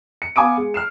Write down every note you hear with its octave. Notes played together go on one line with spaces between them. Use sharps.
C#7
B3 F5 G#5 D6 D#6 D7
G#3
F6 C7 E7